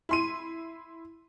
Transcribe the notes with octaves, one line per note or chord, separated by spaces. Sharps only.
E4 C6 D#7